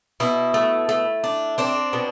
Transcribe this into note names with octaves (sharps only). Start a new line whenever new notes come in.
B2 E4
A3
A3
D4
C4 D4
B2